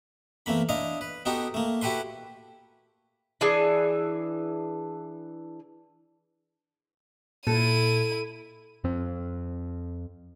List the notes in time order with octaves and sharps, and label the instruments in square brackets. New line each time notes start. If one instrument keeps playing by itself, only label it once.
[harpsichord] E2 A3 A#3 B5
D4 E4 D#5 F5
B4
B3 D#4 F#4 G4 A4
A3 A#3
E4 F#4 G4 A4 B4 C6
[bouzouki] E3 D4 G#4 A5
[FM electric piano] A#2 [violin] E4 D#7 [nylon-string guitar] A4
[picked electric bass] F2 C4